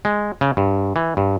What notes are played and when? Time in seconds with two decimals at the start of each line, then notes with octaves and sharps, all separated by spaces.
0.05 G#3
0.41 C#3
0.57 G2
0.96 E3
1.17 G2